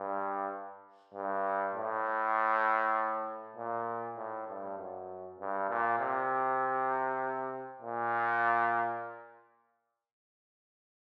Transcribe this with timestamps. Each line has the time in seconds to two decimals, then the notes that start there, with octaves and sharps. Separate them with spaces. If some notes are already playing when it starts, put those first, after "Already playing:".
Already playing: G2
1.14 G2
1.74 A2
3.56 A#2
4.17 A2
4.48 G2
4.78 F#2
5.39 G2
5.69 A#2
5.99 C3
7.82 A#2